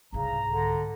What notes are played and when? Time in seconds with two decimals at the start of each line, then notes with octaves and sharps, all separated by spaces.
0.13 C2 G#2 C#3 A#5
0.46 D3